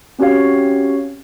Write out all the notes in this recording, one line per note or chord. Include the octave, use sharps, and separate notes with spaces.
C4 C#4 F#4 G4 C#5 F5